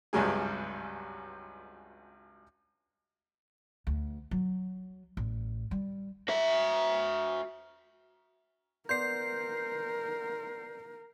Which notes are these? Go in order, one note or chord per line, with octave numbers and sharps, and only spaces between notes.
G#1 C#2 G2 F#3 G3 G#4
D2
F#3
A1
G3
F#4 E5
B3 A#4 D5 C6 G6 C7